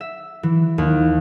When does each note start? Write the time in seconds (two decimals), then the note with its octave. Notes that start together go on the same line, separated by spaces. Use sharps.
0.01 E5
0.43 E3
0.78 D#2